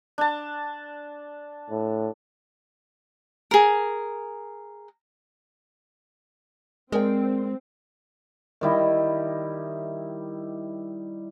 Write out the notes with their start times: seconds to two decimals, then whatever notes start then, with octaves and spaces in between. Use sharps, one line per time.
0.18 D4 A5
1.70 A2
3.51 G#4 A#4
6.92 G#3 C4 A#4 D5 G5
8.61 D#3 G3 E4 D#5